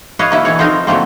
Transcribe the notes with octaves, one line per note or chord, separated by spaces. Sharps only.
B4 C#5 D#5 F5
D3 A#3 E4
B2 E3 C#5
F3 C4 D#4 A#4
D3 F#3 A3 A#3 C4